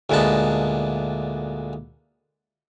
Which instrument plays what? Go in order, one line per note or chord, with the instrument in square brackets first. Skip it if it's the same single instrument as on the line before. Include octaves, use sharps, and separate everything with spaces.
[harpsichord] D2 A#2 G#3 B3 A5